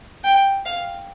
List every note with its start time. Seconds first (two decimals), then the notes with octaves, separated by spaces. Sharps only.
0.24 G5
0.65 F5